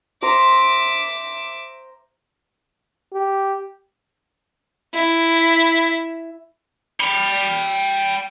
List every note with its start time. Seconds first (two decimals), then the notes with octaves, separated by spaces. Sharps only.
0.22 C5 E5 A#5 D6
3.13 G4
4.94 E4
7.00 G5 B5